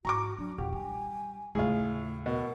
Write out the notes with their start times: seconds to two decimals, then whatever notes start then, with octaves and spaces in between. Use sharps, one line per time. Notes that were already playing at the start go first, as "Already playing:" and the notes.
0.05 G#2 F#4 A#5 C#6 D6
0.38 F#3 D4
0.58 E2 A#2 G4 F#5
0.73 G3 G#5
1.55 D#2 A2 C#3 A3 F4 G#4
2.26 B2 A#4